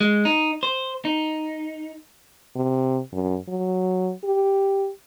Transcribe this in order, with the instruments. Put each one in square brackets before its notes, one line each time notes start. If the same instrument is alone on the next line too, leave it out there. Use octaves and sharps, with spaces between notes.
[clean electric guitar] G#3
D#4
C5
D#4
[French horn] C3
F#2
F#3
G4